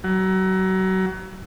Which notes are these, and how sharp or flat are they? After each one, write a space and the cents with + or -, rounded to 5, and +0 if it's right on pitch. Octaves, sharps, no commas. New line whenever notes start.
F#3 +30